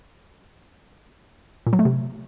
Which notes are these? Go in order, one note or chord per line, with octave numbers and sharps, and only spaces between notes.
A#2
F#3
A3
C3